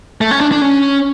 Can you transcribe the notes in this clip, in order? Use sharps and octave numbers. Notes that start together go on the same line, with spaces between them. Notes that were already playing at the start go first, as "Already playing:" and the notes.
A3
C#4
D4
D4
C#4